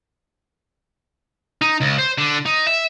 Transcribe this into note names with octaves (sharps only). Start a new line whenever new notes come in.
D#4
C#2
C5
D3
D#4
E5